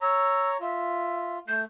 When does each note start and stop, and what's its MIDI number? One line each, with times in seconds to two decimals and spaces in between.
0.01 0.57 73
0.01 0.57 82
0.01 0.49 88
0.61 1.39 65
0.61 1.35 76
1.48 1.65 57
1.48 1.61 91